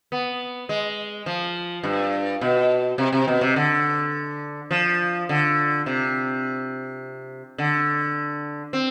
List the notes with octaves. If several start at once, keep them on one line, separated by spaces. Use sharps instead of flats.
B3
G#3
F3
G2
B2
C3
C3
B2
C3
D3
F3
D3
C3
D3
C4